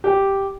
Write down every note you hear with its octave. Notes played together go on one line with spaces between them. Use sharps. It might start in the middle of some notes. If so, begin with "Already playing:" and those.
G4